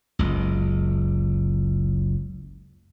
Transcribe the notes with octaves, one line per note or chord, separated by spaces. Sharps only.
F#1 C#2